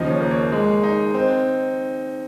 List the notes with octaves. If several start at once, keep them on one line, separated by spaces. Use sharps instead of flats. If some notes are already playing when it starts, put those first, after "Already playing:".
Already playing: D#2 C#3 F3 D#5
C#5
A#3
C#5
G#3
D#4
C4